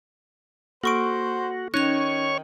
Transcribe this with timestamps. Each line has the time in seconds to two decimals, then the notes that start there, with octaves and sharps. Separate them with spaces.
0.84 A#3 F#4 A4 C5 C#6 D7
1.74 D#3 C#4 D#4 C#5 C#6 F#6 F7